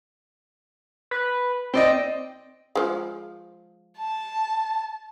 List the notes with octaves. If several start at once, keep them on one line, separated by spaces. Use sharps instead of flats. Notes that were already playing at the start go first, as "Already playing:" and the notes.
B4
C4 D5 D#5 G5
F3 G#3
A5